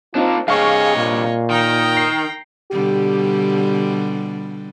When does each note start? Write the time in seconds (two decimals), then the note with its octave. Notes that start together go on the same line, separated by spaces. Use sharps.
0.15 A#3 C4 D4 D#4 F4
0.48 G2 C3 G#4 C#5 D#5 F5 C#6
0.97 A#2
1.50 D#3 G5 A#5
1.97 C7
2.71 B2 D3 G3 G4